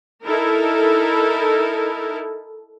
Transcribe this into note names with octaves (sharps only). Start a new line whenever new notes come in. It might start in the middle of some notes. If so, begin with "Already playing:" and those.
D#4 E4 A4 A#4